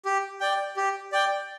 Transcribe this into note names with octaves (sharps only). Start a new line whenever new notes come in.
G4
D5 G5
G4
D5 G5